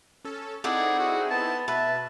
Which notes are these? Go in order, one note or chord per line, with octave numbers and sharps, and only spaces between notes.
C#4 A4
C4 D#4 E4 G#4 A4 D5 F#5
F#4 G#4
B3 A5
B2 B4 E5 A5